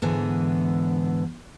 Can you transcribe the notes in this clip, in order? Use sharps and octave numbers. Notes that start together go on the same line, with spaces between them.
G#2 D3 E3 B3 G#5